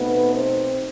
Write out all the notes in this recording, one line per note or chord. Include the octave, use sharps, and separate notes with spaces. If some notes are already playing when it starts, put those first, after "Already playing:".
Already playing: B2 A3 B3 C4 D#4 B4
C4 C5